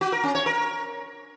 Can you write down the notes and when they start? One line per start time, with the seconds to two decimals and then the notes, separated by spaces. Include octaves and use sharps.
0.01 F#4
0.12 A#4
0.24 C#4
0.35 C#5
0.46 A#4